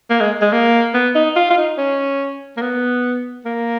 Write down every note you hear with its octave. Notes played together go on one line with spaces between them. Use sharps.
A#3
G#3
G#3
A#3
B3
D#4
F4
F4
D#4
C#4
A#3
B3
A#3